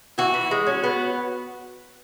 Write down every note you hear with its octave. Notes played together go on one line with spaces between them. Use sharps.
E3 F#4
E3
G#3
C#4
B3